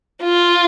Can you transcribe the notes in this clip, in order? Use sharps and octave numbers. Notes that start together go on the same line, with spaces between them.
F4